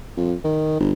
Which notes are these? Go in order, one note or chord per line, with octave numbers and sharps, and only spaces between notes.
F2
D#3
G1